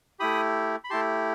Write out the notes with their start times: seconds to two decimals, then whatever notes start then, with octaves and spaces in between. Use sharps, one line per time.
0.19 A3 E4 G4 B5 D#6
0.84 B5
0.90 A3 E4 G4 A5 C6